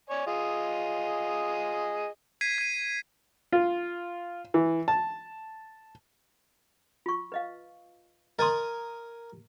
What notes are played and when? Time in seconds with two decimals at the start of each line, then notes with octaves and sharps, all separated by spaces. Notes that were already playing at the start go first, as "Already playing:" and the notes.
0.10 C#5 D5 G#5
0.27 F4 G#4 D#5
2.41 G#6 B6 C7 D#7
2.58 G#6 D#7
3.52 F4
4.54 E3
4.88 A5
7.06 F4 C#6
7.32 B4 D#5 F5
8.39 A#4 D#5 G#5 C6 D#6